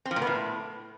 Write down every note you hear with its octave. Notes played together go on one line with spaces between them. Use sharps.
C4
F3
A#2
B3
A2